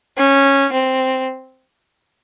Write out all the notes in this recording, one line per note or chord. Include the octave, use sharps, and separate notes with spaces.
C#4
C4